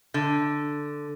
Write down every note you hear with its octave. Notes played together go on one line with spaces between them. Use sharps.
D3